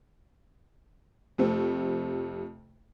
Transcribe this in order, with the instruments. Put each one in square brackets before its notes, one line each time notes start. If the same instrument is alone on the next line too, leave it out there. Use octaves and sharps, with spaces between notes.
[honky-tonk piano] F2 C3 A3 C4